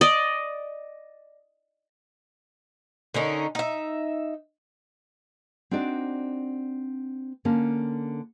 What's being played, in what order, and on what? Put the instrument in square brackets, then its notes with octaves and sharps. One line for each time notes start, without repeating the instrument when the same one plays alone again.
[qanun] D5 D#5
[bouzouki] D3 C#4 D#4 A#4
D#4 E5
[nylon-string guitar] C4 D4 D#4 F#4 D5
D3 A#3 C#4